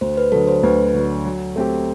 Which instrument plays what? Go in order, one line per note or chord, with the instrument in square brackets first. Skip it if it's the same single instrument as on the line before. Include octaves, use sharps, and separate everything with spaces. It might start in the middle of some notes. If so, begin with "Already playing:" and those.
[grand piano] D2 [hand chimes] C5
[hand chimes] B4
[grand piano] D3 F#3 [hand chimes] A4
[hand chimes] C5
[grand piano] D2 [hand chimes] B4
[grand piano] D3 F#3
F#3
A3 C4 G4